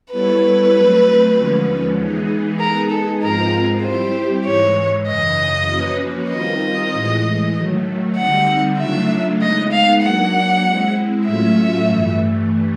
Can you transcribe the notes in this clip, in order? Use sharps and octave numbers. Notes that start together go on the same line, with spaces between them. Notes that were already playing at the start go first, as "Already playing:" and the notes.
G3 B3 E4 A4 B4 C#5
F#3 A3 C4
D#2 D3 F3 G#3 C#4
E3 G#3 B3 D#4 G#4
G#3 B3 D#4 G#4 A#4
A4
G#2 F3 G#3 C4 F4 A#4
G3 C4 E4 G4 C5
G#2 E3 G#3 C#5
F#2 C#3 E3 D#5
F3 A#3 C#4 F#4 B4
D#3 G3 C4 F4 A#4 D#5
A2 E3 G#3
D#3 F#3 A3
D3 G3 C4 D#4 F#5
C#3 F#3 A3 D4 F4 E5
G#3 B3 D#4 D#5
F5
F#3 A#3 D4 F#5
G#3 C4 E4
A2 F#3 A3 C#4 F4 E5
G2 E3 A3